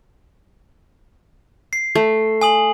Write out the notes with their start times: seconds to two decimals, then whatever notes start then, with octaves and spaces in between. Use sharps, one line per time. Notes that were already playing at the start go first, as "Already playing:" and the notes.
1.73 C7
1.95 A3
2.41 G#5 D#6 F#7